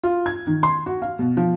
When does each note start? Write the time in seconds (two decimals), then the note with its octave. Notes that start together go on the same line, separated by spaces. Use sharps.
0.04 F4
0.26 G#6
0.47 D#3
0.63 C6
0.86 F#4
1.02 F5
1.19 B2
1.37 F3